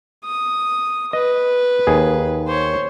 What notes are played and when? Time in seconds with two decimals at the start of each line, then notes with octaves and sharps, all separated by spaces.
0.25 D#6
1.13 B4 D#5
1.87 D#2 G#4
2.47 C5 C#5